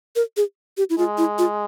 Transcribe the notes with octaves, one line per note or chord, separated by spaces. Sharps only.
A#4
G#4
G4
E4
G#3 F4
E4
F4